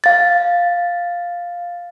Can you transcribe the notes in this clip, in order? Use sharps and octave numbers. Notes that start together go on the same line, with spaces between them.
F5 A6